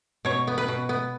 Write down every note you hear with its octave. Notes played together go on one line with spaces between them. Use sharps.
B2 C#5
B3
B4
B2
B3